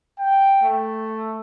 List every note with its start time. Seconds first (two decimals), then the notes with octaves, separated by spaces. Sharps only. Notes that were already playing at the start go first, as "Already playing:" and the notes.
0.18 G5
0.62 A3